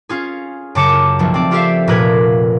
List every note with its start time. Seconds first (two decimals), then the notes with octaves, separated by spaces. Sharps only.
0.09 C#4 F4 G#4
0.75 F#2 C#3 A5 D6 C#7 E7
1.19 B1 B2 F3 A3
1.34 C4 D5
1.51 F4 G4 A4 C5 E5 F5
1.87 F1 A#2 A#4 B4 G#6 B6